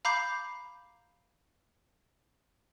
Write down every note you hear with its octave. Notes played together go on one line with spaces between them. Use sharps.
F5 A#5 B5 D6 G6 C7